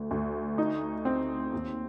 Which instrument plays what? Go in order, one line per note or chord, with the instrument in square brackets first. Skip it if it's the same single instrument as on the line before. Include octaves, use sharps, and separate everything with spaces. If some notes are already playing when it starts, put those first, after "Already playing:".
Already playing: [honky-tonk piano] D2
D2
D#4
C4
D#2